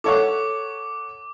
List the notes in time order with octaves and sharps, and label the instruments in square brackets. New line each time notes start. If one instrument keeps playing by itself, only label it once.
[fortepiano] A4 C#5 F#5 [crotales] D6